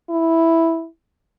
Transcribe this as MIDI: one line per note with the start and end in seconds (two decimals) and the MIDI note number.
0.10 0.87 64